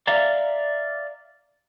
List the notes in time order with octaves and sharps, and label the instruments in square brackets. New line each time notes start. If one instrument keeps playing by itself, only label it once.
[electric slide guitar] D5 E5 F5 A#5